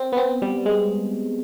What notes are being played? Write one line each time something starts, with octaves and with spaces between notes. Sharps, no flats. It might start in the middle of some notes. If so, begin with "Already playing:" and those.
Already playing: C4
B3
C4
G3
G#3